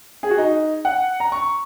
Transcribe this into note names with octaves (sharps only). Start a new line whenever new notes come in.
G#4
F#4
D#4
F#5
A#5
C#6